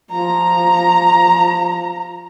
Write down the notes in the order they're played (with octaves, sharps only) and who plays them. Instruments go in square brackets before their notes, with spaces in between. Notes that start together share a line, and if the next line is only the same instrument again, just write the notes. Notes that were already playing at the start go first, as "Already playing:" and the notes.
[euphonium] F3 [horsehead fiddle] A#5